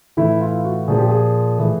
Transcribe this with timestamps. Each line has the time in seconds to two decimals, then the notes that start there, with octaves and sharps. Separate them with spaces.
0.17 A2 E3 E4
0.41 F4
0.64 F#4
0.88 A#2 F3 G#4
0.98 G4
1.09 G#4
1.58 A2 E3